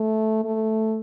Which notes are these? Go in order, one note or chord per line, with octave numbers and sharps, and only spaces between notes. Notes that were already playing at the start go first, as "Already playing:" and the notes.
Already playing: A3
A3